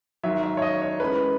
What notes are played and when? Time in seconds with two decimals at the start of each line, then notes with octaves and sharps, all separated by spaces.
0.23 G#2 D#3 F#3 E5
0.43 E5
0.57 C#5
0.62 D#5
0.82 C#5
1.00 F#2 E3 G#3 B4